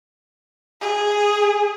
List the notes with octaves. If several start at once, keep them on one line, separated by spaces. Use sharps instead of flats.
G#4